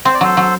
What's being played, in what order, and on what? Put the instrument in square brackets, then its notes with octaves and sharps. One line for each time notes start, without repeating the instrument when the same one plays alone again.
[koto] C4 [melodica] C5
[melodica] D5
[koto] F#3 [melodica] A4 C5
[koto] F#3